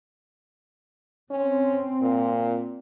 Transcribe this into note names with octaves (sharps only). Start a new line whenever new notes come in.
C4 C#4
A#2